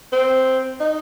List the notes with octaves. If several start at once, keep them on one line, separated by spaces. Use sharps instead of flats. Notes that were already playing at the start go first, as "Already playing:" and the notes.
C4
D#4